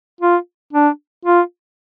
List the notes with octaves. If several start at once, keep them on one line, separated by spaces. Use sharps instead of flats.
F4
D4
F4